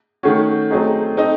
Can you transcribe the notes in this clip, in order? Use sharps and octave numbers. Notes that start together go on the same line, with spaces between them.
D#3 A3 C#4 F#4
F#3 A3 C4 D#4 G#4
C4 D#4 A4 D#5